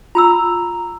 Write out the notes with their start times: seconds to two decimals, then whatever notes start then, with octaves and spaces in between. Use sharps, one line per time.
0.15 F4 A#5 B5 E6